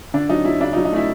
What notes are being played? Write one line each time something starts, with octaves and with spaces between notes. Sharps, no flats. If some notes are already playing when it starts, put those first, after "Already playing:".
D3 D4
F#3 D#4
F#3 E4
C#3 D4
D#4
F#3
D#4
A3 E4